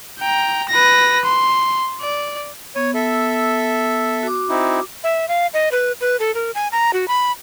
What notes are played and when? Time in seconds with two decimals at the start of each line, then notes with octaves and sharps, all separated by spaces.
0.20 G5 A#5
0.69 B4 A#6
1.25 C6
2.01 D5
2.76 B3 C#5
2.95 A4 E5
4.23 F#4 D6
4.50 C4 D#4 E4
5.04 E5
5.28 F5
5.54 D#5
5.72 B4
6.01 B4
6.20 A4
6.35 A#4
6.55 G#5
6.72 A#5
6.93 F#4
7.08 B5